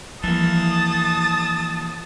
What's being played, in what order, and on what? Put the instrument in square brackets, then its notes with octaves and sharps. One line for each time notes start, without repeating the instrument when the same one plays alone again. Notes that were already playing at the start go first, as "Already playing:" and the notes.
[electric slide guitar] E3 A#3 [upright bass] F3 G3 [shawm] A5 [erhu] D#6